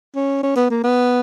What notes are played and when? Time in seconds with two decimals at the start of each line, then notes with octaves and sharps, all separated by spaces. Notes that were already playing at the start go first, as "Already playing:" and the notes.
0.15 C#4
0.43 C#4
0.56 B3
0.70 A#3
0.84 B3